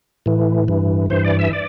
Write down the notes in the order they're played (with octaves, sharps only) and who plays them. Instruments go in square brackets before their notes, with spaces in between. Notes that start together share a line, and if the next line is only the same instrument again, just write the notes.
[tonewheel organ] A2 E3
G2 E3
G2 E3 C5
D5
E5
D5